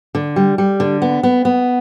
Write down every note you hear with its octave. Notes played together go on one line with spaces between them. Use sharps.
D3
G3
G3
D3
B3
B3
B3